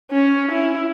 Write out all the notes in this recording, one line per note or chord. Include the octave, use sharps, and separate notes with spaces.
C#4
E4